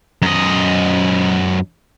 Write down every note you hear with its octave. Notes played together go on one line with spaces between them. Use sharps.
F#2 D#5